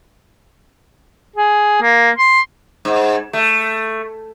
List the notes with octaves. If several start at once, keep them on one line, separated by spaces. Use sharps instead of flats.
G#4
A#3
C6
G#2
A3